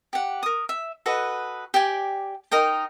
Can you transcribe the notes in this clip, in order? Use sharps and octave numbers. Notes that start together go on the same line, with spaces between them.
G4 F#5
A#4 D#6
E5
F#4 A4 B4 D#5
G4 D5 G5 G#5
D#4 A#4 D#5 G5